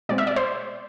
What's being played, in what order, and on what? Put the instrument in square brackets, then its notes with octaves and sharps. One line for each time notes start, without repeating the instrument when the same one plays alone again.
[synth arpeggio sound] B2 G#3 C4 D5
E5
D5
C5